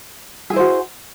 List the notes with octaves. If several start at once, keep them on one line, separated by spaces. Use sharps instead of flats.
E4 F#4 G#4 C5